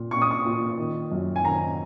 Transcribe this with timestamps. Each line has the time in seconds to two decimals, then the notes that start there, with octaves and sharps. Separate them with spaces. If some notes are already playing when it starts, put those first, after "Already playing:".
Already playing: A#2
0.11 A#2 C#6
0.22 D#6
0.31 C#6
0.45 A#2
0.78 D#3
1.12 F#2
1.36 G#5
1.44 D#3 A#5